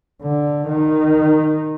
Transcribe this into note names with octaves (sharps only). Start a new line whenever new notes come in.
D3
D#3